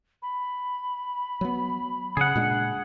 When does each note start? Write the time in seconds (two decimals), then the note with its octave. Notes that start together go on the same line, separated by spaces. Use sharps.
0.22 B5
1.41 F#3 B3
2.17 C#3 G#4 F#5
2.35 A#2 G#3 D4